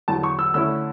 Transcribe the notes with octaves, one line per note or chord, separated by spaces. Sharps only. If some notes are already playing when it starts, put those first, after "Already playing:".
E2 D3 F#3 A5
C#6
E6
D3 A3 C#4 E4 E6